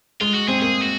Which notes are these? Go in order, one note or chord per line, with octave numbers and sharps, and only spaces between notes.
G#3 F4
F#4
C4 G#4
A#3 G#4
F#4